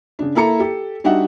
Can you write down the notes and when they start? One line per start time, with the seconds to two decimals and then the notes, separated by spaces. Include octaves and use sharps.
0.19 C#3 D4
0.35 A#3 E4 A4 A#5 C#7
0.60 G4 A4
1.04 G3 D4 D#4 F#4 E5 F#5